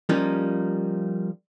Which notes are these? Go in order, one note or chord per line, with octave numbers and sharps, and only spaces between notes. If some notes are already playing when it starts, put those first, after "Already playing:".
F3 G3 A#3 C#4 D#4